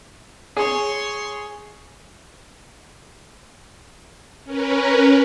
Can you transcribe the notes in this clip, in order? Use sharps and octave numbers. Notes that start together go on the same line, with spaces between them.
G#4 C#5 C6
C#4 A#4 B4